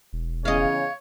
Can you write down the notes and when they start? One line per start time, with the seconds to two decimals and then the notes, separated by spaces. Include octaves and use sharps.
0.13 E1
0.45 E2 C#3 C#5 D#5 F5